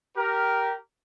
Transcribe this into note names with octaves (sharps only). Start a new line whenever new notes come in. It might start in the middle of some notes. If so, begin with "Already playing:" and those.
G4 A#4